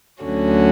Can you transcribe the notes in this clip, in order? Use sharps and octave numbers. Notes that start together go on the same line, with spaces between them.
D2 D3 F#3 C#4 F#4